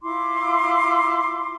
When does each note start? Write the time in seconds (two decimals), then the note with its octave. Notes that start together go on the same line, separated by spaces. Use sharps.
0.03 E4 F4 C6 D6